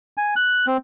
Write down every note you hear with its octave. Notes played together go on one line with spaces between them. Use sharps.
G#5
F#6
C4